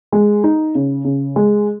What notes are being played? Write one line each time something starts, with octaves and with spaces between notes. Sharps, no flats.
G#3
D#4
C#3
C#3
G#3